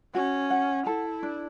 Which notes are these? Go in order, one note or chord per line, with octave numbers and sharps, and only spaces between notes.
C#4 F#4
F#5
E4 A4
D4